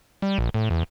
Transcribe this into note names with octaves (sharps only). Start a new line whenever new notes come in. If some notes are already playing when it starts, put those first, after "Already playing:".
G3
A#1
A2
E2